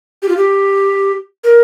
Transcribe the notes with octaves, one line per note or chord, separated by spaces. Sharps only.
G4
F4
G4
A#4